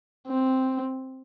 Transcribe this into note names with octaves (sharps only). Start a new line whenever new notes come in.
C4